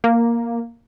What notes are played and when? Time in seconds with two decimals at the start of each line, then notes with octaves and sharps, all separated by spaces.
0.04 A#3